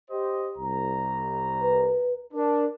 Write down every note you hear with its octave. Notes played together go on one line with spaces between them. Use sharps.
G4 C5 D#5
C2 A#5
B4
D4 A#4